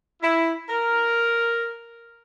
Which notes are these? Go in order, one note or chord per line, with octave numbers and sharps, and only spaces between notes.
E4
A#4